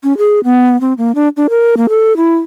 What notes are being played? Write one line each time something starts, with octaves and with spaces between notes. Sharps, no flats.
C#4
G#4
B3
C4
A#3
D4
D4
A#4
A#3
A4
E4